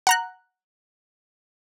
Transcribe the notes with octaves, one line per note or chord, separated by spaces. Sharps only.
F#5 A#5 F#6